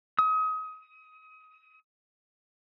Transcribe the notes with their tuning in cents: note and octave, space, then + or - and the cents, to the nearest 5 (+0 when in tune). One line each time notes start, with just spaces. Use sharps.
D#6 +30